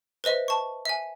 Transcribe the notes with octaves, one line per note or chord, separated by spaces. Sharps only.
B4 C5 D#5 E5
A5 C#6
E5 G#5